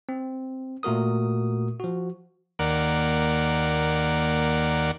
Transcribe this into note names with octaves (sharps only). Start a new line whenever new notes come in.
C4
A#2 A3 F#4 A#4 D#6
F3 F#4
D#2 A#3 D5 F#5